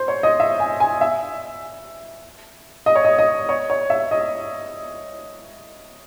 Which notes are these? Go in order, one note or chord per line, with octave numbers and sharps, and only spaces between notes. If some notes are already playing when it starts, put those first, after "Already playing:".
Already playing: C5
C#5
D#5
E5
G#5
G#5
E5
D#5
C#5
D#5
D#5
C#5
C#5
E5
D#5